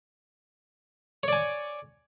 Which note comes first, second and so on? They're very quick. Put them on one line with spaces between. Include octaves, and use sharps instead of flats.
C#5 D5 G#5